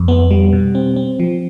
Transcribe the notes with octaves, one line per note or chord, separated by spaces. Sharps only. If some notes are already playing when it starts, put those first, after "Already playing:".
Already playing: F2
B3
G3
B2
C4
C4
F3